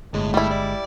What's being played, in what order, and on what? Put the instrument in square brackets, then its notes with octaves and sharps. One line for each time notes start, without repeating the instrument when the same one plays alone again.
[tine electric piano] G1 G#3 [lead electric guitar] A2
[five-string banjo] G3 E4 [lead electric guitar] A3
[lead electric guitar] D5